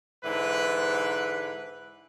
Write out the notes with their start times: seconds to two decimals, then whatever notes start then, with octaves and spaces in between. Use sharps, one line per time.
0.25 G#2 D3 E3 B4